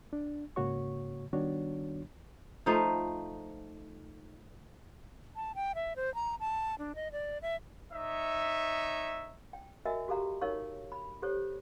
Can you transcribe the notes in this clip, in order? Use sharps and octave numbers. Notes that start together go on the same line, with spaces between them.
D4
G#2 C#3 A#3 F#4 C#5 C#6
D#3 G3 B3 D4 F#4 C#5
F3 A3 D#4 C5
A5
G5
E5
C5
A#5
A5
D4
D#5
D5
E5
D#4 C#5 E5
G5
F#4 A#4 D#5 E5 G#5
F#4 G4 A4 F5 A#5
D#4 A#4 C#5 F5 C#6
B5
G4 A4 C5 C#5